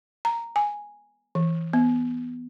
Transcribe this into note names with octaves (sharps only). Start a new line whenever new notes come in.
A#5
G#5
E3
B3